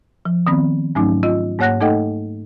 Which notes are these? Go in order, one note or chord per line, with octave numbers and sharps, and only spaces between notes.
F3
D#3 B3 C4
G#2 F#3 A3 C#4 D#4
F4 D#5
G#2 A#3 C#5 F#5 F#6 A#6
A3 D#4 A4 D#5 F#5 G5